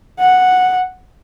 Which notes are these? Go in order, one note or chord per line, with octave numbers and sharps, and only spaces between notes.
F#5